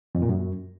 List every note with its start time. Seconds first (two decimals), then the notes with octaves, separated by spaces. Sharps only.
0.15 F2
0.22 A#2
0.29 F#2